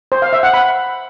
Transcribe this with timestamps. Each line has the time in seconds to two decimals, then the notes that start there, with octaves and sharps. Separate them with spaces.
0.12 C5
0.22 F5
0.33 E5
0.43 F#5
0.54 B5